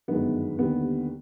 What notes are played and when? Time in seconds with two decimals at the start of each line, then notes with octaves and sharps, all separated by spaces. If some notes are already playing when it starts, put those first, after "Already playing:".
0.08 G1 F#2 D#3 G#3 B3
0.59 D#2 D3 G3 B3